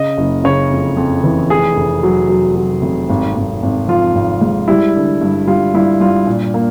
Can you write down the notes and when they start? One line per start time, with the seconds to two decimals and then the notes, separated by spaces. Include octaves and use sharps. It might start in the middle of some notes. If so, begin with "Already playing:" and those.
Already playing: C#3 D#5
0.18 F#1
0.44 C#3 C#5
0.71 F2
0.97 F2
1.24 E3
1.50 F1 G#4
1.77 F1
2.03 F#3
2.29 F#3
2.56 F#3
2.82 F1
3.09 G#1
3.36 G#1
3.63 G#1
3.88 F3 F4
4.15 G#1
4.41 G#2
4.68 G3 E4
4.95 D3
5.21 G2
5.47 G3 F4
5.74 G2 E4
6.00 G2 F4
6.27 A#2
6.54 A#3